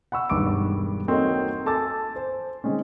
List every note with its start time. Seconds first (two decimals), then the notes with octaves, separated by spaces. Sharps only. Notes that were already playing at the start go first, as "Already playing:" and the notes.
0.12 F#5 B5 C#6 E6
0.30 E1 G2 D#3 C#6 D6 D7
1.08 A#3 C4 D#4 F#4 A4 C#5
1.65 A4 G#5 A5 D6 E6 A6
2.16 C5
2.64 D#3 G#3 C4 C#4